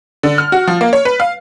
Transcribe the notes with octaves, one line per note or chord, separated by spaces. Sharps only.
D3
F6
F#4
F3
A#3
C#5
B4
F5